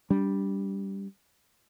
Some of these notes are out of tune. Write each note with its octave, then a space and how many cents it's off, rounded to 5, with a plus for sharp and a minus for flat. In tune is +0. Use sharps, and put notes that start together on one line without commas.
G3 +0 D4 -25